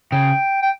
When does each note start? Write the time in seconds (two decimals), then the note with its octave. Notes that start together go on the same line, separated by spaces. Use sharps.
0.12 C#3 G5
0.62 G5